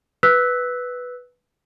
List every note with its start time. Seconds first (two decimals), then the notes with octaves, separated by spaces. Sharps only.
0.23 B4 E6 F#6 B6